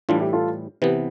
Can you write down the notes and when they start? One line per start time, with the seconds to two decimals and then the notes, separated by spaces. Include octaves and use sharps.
0.09 A2 E3 G3 D4 F4
0.20 E4 G4
0.33 F4 A4
0.82 C3 E3 B3 G4 B4